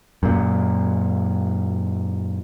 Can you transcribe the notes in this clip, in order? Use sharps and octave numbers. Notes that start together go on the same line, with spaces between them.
F#2 A#2